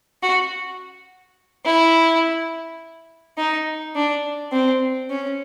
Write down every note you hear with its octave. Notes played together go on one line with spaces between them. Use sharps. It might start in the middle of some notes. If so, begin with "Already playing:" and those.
F#4
E4
D#4
D4
C4
C#4